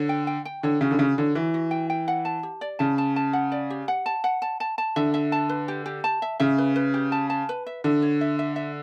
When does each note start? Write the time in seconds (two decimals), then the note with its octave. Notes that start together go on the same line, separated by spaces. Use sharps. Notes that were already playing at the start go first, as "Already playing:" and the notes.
Already playing: D3 C#5
0.09 G5
0.27 G5
0.45 G5
0.63 D3 C#5
0.81 C#3 F#4
0.91 D3
0.99 C#3 F#4
1.18 D3 C#5
1.35 E3 F#4
1.54 F#4
1.71 G5
1.90 G5
2.08 F#5
2.25 A5
2.43 G4
2.61 D5
2.79 C#3 A5
2.98 A5
3.16 A5
3.33 F#5
3.52 D5
3.70 G4
3.88 F#5
4.06 A5
4.24 F#5
4.42 A5
4.60 A5
4.78 A5
4.96 D3 E5
5.14 E5
5.32 A5
5.49 B4
5.68 G4
5.86 G4
6.04 A5
6.22 E5
6.40 C#3 E5
6.58 B4
6.76 B4
6.94 G4
7.12 A5
7.30 A5
7.49 B4
7.67 E5
7.84 D3 E5
8.02 C#5
8.21 E5
8.39 E5
8.56 E5